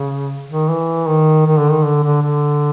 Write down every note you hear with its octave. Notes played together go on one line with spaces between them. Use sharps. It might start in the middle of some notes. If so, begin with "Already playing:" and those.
Already playing: C#3
D#3
E3
D#3
D#3
D3
D#3
D3
D3
D3